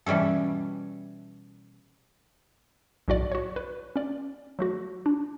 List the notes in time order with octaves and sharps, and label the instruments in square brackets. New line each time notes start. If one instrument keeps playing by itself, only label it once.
[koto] B2 E3 G3 C#4 A4
[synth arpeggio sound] B1 A2 F#4 D5
F#4 C#5
B4
C#4 D5
F#3 A3 F#4
D4